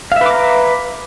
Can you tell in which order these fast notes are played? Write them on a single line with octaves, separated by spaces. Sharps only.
F5 E5 B4 D6 A#5